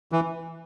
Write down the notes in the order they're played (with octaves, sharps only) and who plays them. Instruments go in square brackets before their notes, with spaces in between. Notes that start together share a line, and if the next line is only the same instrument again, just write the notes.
[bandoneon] E3